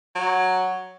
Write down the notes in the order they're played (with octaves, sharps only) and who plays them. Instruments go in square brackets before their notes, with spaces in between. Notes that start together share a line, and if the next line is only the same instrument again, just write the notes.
[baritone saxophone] F#3